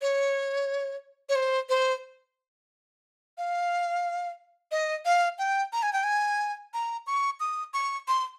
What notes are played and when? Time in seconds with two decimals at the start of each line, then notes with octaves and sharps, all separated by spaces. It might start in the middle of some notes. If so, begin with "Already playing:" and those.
0.01 C#5
1.29 C#5
1.35 C5
1.69 C5
3.38 F5
4.71 D#5
5.05 F5
5.38 G5
5.73 A#5
5.83 G#5
5.93 G5
6.04 G#5
6.74 A#5
7.07 C#6
7.40 D#6
7.74 C#6
8.08 C6